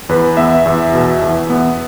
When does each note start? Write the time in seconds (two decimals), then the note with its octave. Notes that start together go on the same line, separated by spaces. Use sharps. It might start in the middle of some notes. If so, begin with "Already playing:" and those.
0.09 E2 B4
0.37 B3 E5
0.66 E2
0.94 B2
1.22 E2
1.50 B3